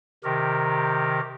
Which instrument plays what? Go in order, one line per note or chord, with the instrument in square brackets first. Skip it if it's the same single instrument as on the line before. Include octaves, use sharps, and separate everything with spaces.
[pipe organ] C3 D#3 G4 A#4